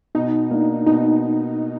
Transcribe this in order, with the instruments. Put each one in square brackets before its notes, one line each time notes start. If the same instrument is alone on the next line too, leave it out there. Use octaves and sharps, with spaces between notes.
[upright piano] B2 [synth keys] D#4
[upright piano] A#3 D4
[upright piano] B2 [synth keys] D#4